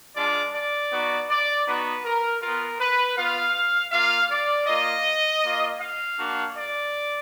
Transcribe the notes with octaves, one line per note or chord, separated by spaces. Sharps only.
G#3 D4 F4 D5
D5
B3 D#4 F#4
D5
B3 D#4 F#4 B4
A#4
B3 F4 A#4
B4
B3 F4 F5
A#3 F4 F5
D5
A#3 F4 D#5
A#3 F4
F5
A#3 D4 F#4
D5